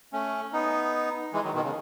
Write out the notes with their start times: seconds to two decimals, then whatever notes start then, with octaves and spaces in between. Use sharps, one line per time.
0.13 A3 C#4
0.53 B3 D#4
1.33 E3 G#3
1.44 D#3 F#3
1.54 B2 D#3
1.64 C#3